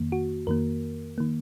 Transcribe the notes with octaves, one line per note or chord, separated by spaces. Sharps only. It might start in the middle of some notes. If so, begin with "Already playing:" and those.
Already playing: F2 D#3 A#3
F#4
F2 D#3 A#3 A#4
D#3 A#3